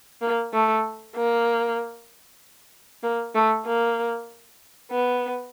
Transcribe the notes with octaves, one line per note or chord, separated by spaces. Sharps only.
A#3
A3
A#3
A#3
A3
A#3
B3